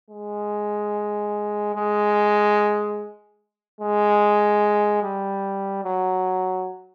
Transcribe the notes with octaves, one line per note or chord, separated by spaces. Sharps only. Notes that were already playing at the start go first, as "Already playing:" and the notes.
G#3
G#3
G#3
G3
F#3